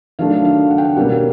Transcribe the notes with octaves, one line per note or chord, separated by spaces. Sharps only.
D#3 F#3 A3 D4 F5
F5
F#5
G5
F#5
B2 G3 A#3 C#4 F#5